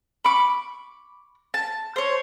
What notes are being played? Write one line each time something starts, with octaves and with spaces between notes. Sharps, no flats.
B5 C#6 D6
A5
C5 C#5